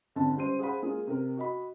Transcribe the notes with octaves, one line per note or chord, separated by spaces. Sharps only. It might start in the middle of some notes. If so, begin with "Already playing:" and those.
G#1 F2 D3 A5
C#2 G3 C5 C6 D#7
G#4 C5 F5 F#5 B5
G#3 A#3 F4 G#4
C3 A#4
F#4 D#5 B5